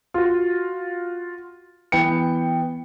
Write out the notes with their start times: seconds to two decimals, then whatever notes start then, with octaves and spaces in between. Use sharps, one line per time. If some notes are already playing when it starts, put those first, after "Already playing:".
0.14 F4 F#4
1.92 E3 B3 G5 C#7